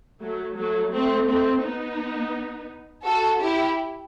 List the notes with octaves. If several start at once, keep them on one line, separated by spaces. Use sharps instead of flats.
F#3 A3
F#3 A3
A3 C4
A3 C4
B3 D#4
F#4 A4
E4 G4